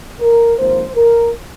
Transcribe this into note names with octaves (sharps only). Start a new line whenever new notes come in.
A#4
G#1 G#2 F3 A#3 C5
A#4